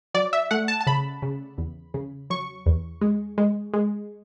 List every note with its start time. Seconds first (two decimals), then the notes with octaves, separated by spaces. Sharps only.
0.14 F#3 D5
0.33 E5
0.51 A3 F#5
0.68 A5
0.81 A5
0.87 C#3 B5
1.22 C#3
1.58 E2
1.94 C#3
2.30 F#3 C#6
2.66 E2
3.01 G#3
3.38 G#3
3.73 G#3